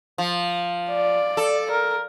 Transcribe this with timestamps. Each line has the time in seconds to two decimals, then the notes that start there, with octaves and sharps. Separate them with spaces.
0.18 F3
0.90 D5
1.37 A4
1.71 A#4